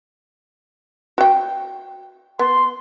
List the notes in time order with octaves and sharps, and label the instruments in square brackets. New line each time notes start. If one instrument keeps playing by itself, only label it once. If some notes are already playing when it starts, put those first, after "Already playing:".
[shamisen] F#4 G5
[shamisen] B3 [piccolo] C6